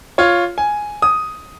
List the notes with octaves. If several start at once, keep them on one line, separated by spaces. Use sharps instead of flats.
F4 C#5
G#5
D#6